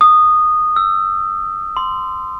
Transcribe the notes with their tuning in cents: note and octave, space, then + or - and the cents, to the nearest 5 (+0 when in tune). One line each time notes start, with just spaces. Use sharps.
D#6 -15
E6 +15
C6 -15